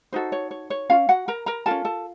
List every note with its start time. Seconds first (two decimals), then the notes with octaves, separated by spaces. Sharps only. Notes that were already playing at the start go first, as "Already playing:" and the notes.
0.12 D#4 F#4 A4 C5
0.32 C#5
0.51 C#5
0.70 C#5
0.90 C#4 F4 F5
1.09 F#4 F#5
1.28 A#4 A#5
1.46 A#4 A#5
1.66 C#4 F4 A4 A#4 A5
1.85 A4 A5